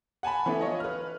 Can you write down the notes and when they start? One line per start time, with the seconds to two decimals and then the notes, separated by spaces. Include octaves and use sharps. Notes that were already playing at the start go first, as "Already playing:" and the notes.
0.23 F#5 G#5 A5 B5
0.46 E3 A3 B3 D4 E4
0.61 F4 C#5 D#5
0.80 B4 F6